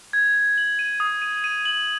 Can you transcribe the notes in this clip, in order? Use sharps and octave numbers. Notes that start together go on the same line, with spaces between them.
G#6
G#6
F#7
D#7
D#6
D#7
D#7
F#7